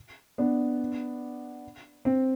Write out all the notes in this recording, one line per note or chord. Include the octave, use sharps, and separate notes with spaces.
B3 D4
C4